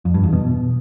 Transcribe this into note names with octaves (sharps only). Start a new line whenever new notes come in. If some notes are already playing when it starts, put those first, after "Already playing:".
F2
G2
E2
B2